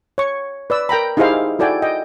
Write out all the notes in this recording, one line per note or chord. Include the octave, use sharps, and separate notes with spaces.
C#5 C#6
B4 D5 E6
A#4 G5 A#5 B5
D#4 E4 G4 G#4 C5 F5
E4 F#4 A4 D5 G5 G#5
D#5 G5